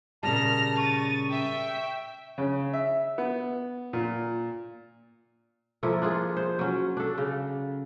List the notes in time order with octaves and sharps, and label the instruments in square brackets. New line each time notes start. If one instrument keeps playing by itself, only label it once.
[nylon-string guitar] A#2 C#3 G3 [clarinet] A5 [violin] F6 A#6
[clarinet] C#6 [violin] A6 D#7
[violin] E5 G5
[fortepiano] C#3
E5
B3
A#2
[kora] F3 A#3 E4 A4
D4 F4 G#4
C5
F#3 C#4
D4 A4
C#3